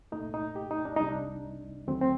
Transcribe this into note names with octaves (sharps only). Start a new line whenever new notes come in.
C2 A#2 A3 D#4
D#4
G4
D#4
D4
C2 C3 G3 D#4
D4
D#2 D3 F#3 A3 C4
C4